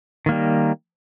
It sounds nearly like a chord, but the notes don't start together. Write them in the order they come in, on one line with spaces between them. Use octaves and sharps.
D#3 A#3 G3